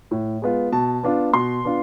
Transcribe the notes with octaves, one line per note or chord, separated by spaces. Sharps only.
A2
G#3 B3 F4
B2 A5
B3 D4 F4
B2 C6
B3 D4 F4